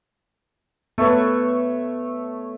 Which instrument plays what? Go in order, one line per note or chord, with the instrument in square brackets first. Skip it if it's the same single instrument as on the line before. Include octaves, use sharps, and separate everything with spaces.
[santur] A3 C#5 [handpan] B3 B4